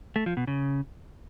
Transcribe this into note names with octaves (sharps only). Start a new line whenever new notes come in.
A3
F3
B2
C#3